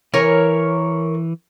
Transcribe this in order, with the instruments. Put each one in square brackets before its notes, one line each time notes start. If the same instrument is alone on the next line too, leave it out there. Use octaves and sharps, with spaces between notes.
[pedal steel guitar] E3 [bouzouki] A#4 C#5 G#5